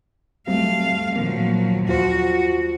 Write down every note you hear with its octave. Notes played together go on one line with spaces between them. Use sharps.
F#3 G3 A3 C4 F5
A#2 D#3 F3 F#3 A#3
D#2 F4 F#4 C5